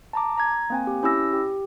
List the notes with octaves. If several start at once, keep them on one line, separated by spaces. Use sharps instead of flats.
A5 A#5 D6
A#5 G#6
A#3 C4 G#5
G4
C#4 E4 G4 E6 A#6
G4